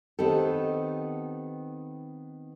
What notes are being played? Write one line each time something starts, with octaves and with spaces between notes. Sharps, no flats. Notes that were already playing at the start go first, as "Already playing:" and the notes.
D#3 B3 C4 D#4 G4 A4